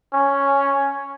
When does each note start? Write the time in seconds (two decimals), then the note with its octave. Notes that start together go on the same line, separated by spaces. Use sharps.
0.13 C#4